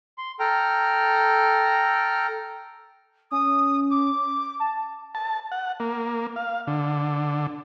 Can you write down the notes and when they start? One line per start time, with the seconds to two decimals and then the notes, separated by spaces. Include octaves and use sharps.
0.18 C6
0.40 A4 G5 A#5 F6
3.31 C#4 D#6
3.91 D6
4.60 A5
5.15 A5
5.52 F#5
5.80 A#3
6.36 F5
6.67 D3